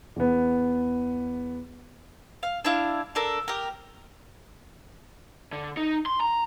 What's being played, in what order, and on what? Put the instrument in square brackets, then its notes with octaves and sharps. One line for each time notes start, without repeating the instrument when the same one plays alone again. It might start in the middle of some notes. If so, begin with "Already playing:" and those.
[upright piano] E2 B3
[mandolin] F5
D4 E4 F5
D4 A4 A#4
G4 A#4
[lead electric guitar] D3
D#4
C6
A#5